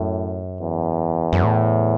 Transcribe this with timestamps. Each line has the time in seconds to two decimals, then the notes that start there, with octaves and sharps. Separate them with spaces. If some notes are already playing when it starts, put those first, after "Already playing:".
Already playing: F#2 A2
0.61 E2
1.33 F#2
1.44 A2